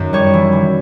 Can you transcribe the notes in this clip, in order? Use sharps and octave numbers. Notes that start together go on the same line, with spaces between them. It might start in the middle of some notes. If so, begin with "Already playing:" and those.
Already playing: F#2 D#3
G3 C#5
E3
E3